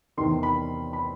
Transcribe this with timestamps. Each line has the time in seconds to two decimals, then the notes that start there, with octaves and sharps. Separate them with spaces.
0.17 E2 C3 D#3 C6
0.43 B5
0.93 B5